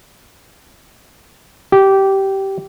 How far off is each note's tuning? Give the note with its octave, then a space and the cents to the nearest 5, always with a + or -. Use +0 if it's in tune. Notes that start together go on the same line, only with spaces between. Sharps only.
G4 -15